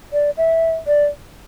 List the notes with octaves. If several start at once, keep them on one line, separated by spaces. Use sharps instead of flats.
D5
E5
D5